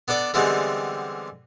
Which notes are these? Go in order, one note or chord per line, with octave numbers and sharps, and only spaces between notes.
B3 D4 A4 D5
D3 E3 G3 G#3 B3 C4